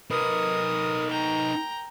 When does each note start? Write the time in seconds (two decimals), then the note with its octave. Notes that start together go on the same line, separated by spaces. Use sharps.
0.11 D#4 A#4 B4 D#6
1.10 G5 A#5